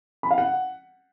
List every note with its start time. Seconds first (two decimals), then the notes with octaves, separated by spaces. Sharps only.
0.23 B5
0.31 F5
0.38 F#5